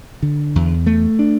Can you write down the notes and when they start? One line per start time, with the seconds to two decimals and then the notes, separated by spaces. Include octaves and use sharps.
0.22 D3
0.56 E2
0.87 A3
1.19 D4